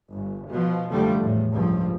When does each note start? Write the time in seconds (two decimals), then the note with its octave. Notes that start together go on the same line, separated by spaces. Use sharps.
0.12 G1
0.48 B2 F3
0.91 F#1 D3 F3 G3 A3
1.20 E2 A2
1.53 C#2 G2 F3